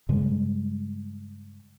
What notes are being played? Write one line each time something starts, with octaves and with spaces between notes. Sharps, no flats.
G2 C#3 G3 G#3